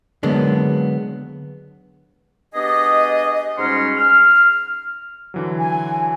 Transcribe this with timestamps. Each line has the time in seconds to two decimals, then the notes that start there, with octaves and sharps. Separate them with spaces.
0.23 D3 F#3 G#3 A#3 B3 D4
2.54 B3 D4 G4 G#4 D#5
3.57 G#2 G3 C#4 F#4 C6 F6
3.96 F6
5.34 D3 E3 F#3
5.59 G#5